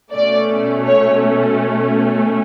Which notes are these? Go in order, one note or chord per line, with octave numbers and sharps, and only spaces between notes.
B2 A3 C#4 D5
C#5